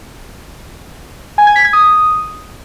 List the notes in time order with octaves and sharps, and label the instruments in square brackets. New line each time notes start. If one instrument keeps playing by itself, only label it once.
[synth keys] G#5
G#6
B6
G#6
D#6